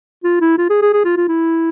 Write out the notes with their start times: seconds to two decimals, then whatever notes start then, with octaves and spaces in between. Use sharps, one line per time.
0.24 F4
0.41 E4
0.58 F4
0.70 G#4
0.82 G#4
0.93 G#4
1.05 F4
1.17 F4
1.28 E4